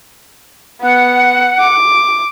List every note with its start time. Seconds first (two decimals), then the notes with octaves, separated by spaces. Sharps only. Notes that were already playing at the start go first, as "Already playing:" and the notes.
0.82 B3 F#5
1.60 D6